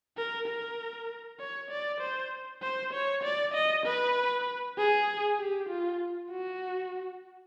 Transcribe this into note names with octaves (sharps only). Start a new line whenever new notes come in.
A#4
A#4
C#5
D5
C5
C5
C#5
D5
D#5
B4
G#4
G4
F4
F#4